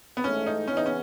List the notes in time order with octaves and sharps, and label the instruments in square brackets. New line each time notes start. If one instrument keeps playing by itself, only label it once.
[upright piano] B3
[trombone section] G#2 E3 A3 [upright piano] C#4
[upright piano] D#4
[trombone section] E2 C#3 E3 B3 [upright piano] C#4
[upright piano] D#4
C#4